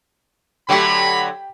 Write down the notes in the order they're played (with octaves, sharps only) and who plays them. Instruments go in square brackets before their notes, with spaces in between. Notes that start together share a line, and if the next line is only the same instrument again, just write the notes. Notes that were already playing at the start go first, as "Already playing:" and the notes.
[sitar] D3 F#3 A3 [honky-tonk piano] G4 G5 [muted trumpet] B5